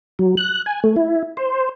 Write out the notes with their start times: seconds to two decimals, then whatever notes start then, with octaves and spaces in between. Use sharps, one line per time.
0.19 F#3
0.37 F#6
0.66 G#5
0.84 A3
0.96 E4
1.37 C5